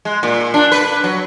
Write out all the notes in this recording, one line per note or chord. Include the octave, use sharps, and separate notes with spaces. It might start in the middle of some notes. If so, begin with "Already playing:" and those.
G#3
A#2
D4
B4
F#3